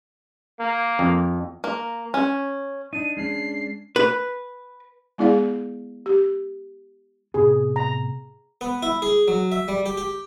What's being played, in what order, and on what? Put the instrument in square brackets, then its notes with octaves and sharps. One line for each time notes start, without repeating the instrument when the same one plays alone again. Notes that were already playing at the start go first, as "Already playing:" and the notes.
[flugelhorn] A#3
[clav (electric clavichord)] F2
[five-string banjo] A#3
C#4
[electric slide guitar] D4 D#4 [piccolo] D#7
[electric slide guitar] G#3 C#4 D4 [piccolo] C7
[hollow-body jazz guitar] B4
[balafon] G#3 B3 E4 G#4 D5 F5
G4
[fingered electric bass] A2 C3 B3 [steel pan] G#4
[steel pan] A#5
[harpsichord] B3
E4
G#4
F#3
E5
G3
G4
G4